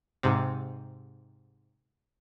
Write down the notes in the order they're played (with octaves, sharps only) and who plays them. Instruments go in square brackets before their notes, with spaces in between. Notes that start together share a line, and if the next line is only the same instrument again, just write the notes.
[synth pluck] G#2 C3